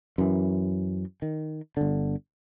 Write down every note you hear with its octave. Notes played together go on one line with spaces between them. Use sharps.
F#2 E3
D#3
G1 D3